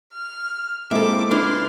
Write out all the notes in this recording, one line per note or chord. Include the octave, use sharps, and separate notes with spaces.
F6
G#3 A#3 C4 E4 A4 E5 D6
C#2 D4 E4 B4 C6 F6